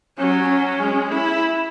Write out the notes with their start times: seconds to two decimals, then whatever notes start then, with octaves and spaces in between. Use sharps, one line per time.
0.18 F#3 C#4
0.48 C#4
0.80 G#3
1.11 E4